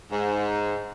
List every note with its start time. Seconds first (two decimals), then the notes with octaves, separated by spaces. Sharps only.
0.11 G#2